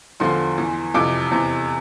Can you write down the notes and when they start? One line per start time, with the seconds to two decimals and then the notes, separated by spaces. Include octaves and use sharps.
0.20 E2 D3 F3 C6
0.58 E2 E3
0.94 F2 C3 E3 D6
1.31 E2 C3 E3